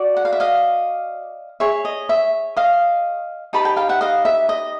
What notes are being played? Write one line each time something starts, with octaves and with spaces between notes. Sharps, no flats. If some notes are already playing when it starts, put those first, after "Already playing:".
Already playing: F#4 D5
F#5
F5
E5
D#5 F5
G#4 C#5 E5
D#5
E5
D#5 F5
D#4 G4 B4 A5 B5
G5 A5
F5 G5
E5 F#5
D#5 F5
E5
D#5